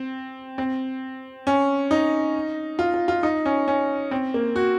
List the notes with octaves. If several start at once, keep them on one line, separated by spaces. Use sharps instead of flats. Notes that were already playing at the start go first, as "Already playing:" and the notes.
Already playing: C4
C4
C#4
D#4
F4
F4
F4
D#4
C#4
C#4
C4
A#3
F#4